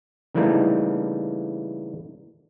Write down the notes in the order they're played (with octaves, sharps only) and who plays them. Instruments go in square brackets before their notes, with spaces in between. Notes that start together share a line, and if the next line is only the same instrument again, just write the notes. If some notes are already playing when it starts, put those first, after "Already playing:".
[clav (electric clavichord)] C#3 E3 G3 A3 A#3 D#4